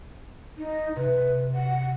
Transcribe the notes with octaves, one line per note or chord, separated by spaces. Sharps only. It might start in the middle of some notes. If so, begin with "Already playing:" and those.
D#4
C3 B4
F#5